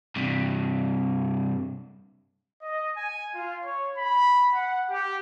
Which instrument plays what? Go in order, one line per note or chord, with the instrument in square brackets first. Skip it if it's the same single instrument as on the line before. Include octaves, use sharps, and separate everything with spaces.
[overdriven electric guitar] G2 C3
[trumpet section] D#5
G#5
F4
C#5
B5
F#5
G4